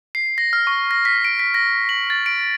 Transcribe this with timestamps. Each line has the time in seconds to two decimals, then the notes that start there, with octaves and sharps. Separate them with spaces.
0.15 C7
0.38 A#6
0.53 F6
0.67 C#6
0.91 A#6
1.05 B6
1.25 D7
1.39 B6
1.54 A#6
1.89 F#7
2.10 A6
2.26 D7